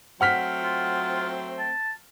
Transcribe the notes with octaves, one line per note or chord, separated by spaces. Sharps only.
F#3 A3 C4 F#5 F6 B6
F4
A5